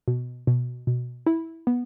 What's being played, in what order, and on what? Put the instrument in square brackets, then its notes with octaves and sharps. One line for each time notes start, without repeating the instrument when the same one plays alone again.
[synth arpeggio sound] B2
B2
B2
E4
B3